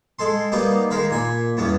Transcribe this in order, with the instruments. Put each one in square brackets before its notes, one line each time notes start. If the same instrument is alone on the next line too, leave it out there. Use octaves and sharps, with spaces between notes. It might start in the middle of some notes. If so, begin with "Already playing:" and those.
[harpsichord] G#3 A4 C6
G3 A#3 B3 D#4 G4
D#3 G#3 A#4 F5 B5
A#2 G#5 B5
E2 G2 B3 C#4